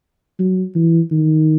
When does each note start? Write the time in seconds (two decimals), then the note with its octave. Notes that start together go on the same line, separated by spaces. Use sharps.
0.39 F#3
0.75 E3
1.11 D#3